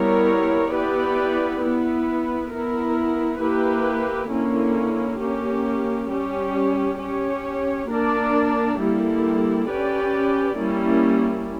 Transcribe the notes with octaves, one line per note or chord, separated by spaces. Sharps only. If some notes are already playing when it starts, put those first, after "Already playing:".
Already playing: G3 B3 E4 A#4 C#5
B3 E4 G4 B4 D5
B3 E4 B4
B3 E4 A#4
A#3 E4 G4 B4
D3 A#3 C#4 E4
A#3 C#4 G4
G3 C#4 G4
C#4 G4 C#5
A#3 D4 A#4 D5
D3 G3 A#3 E4 G4
C#4 G4 B4 D5
G3 A#3 C#4 E4